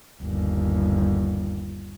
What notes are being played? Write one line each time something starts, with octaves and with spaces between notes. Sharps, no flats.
G1 D#2